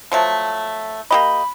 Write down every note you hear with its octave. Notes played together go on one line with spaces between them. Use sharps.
F3 F#3 A3
A#3 G4 D#5 B5